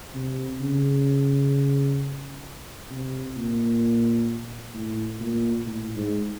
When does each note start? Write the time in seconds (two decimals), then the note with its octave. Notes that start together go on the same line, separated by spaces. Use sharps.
0.14 C3
0.60 C#3
2.90 C3
3.36 A#2
4.74 A2
5.20 A#2
5.66 A2
5.96 G#2